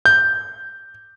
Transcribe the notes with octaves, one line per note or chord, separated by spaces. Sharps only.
G6